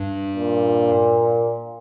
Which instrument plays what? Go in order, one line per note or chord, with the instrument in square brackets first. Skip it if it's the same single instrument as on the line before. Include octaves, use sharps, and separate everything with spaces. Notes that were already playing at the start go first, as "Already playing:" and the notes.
Already playing: [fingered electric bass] G2
[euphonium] A#2